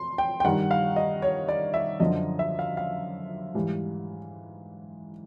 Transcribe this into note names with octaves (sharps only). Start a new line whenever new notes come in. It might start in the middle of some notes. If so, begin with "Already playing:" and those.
Already playing: C6
G5
G5
G2 D#3 G3 F#5
F5
D#5
C#5
D5
E5
F#2 D3 F3 D#5
E5
F5
F5
G#2 E3 G3